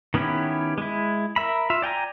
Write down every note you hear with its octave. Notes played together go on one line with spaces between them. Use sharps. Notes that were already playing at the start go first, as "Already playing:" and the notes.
D#3 B3 C#4 E4 G4
G#3 E4
A#4 E5 B5
F4 E5
D5 G5 G#5 A#5